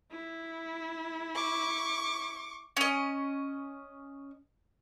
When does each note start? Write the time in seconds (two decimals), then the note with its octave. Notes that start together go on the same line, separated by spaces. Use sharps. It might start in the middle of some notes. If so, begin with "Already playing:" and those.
0.12 E4
1.35 C#6 D6
2.77 C#4 D#5